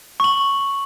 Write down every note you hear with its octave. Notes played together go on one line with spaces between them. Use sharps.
C#6 F#7